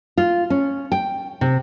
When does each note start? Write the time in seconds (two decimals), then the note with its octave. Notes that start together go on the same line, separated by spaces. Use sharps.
0.17 F4
0.50 C#4
0.92 G5
1.41 C3